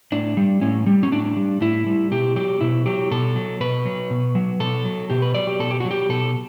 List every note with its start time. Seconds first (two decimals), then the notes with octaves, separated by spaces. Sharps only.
0.12 A2 D4
0.37 G3
0.61 A2 C#4
0.86 G3
1.03 C#4
1.12 A2 D4
1.36 G3
1.61 A2 E4
1.86 G3
2.11 B2 G4
2.36 F#3 G4
2.61 B2 E4
2.86 F#3 G4
3.11 B2 A4
3.36 F#3
3.61 B2 B4
3.86 F#3
4.10 B2
4.35 F#3
4.60 B2 A4
4.85 F#3
5.10 B2 G4
5.22 B4
5.34 F#3 D5
5.47 G4
5.60 B2 A4
5.71 G4
5.80 F#3 F#4
5.91 G4
6.09 B2 A4